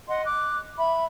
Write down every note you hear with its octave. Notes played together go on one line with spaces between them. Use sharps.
D#5 F#5 C6
D6 F#6
E5 B5